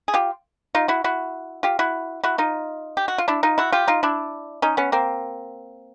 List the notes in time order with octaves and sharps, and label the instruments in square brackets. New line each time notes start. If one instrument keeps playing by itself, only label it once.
[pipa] G#4
F4 G4
D#4 F4
E4 F#4
E4 F#4
F4 G4
E4 F#4
E4 F#4
D#4 F4
G4
F#4
F4
D4 E4
D#4 F4
E4 F#4
F4 G4
D#4 F4
D4 E4
C#4 D#4
B3 C#4
A#3 C4